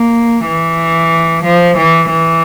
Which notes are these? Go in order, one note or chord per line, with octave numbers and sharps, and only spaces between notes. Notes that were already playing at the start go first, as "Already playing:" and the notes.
Already playing: A#3
E3
F3
E3
E3